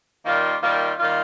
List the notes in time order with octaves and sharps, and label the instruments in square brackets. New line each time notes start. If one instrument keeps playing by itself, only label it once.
[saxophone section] D#3 G3 A#3 F4
D#3 G3 A#3 F4
D#3 G3 A#3 F4